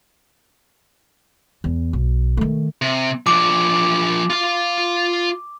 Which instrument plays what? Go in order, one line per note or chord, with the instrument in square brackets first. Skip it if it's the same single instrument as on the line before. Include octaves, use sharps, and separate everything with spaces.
[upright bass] E2
B1
D#3 A3
[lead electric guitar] C3
[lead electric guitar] F3 D4 [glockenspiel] D6
[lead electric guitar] F4 F5